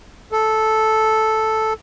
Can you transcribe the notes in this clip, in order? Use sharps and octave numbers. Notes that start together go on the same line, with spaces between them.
A4